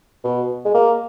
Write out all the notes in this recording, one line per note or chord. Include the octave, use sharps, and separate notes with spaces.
B2
G#3
A#3